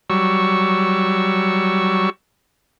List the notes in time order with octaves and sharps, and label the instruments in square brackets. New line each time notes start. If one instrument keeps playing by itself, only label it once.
[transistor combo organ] F#3 G3 C#6 E6